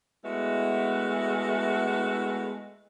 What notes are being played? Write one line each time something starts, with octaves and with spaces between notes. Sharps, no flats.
G#3 A3 B3 E4 F#4